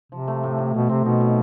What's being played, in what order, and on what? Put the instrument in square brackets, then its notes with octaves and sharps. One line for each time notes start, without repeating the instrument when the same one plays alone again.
[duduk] C3 [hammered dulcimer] F3
[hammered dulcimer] A3
A2
A2
[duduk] B2 [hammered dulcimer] A3
[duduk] C3 [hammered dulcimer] C4
[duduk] B2 [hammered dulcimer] D#4
[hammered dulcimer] F#3